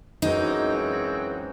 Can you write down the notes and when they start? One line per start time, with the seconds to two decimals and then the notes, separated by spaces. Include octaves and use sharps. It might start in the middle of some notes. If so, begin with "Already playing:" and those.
0.22 F#2 E3 G#3 C4 D#4 F#4